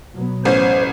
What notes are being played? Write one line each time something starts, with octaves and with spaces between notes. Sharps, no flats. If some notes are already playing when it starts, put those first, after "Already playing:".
B2 F#3 B3
A1 C#4 C5